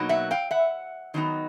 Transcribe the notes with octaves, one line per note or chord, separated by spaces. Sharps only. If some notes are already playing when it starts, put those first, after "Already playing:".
Already playing: B2 F#3 A#3 D#4
E5 F#5
F5 G5
E5 F#5
D#3 F#3 B3 D#4